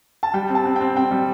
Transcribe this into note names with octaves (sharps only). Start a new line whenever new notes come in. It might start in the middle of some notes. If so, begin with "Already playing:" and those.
A5
G3 G5
C4
A5
C4
G5
C4
C4 G5
G3